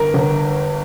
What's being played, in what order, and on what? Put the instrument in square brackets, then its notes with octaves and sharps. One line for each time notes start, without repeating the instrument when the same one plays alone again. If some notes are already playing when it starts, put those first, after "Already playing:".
Already playing: [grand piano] G1 A#4
G1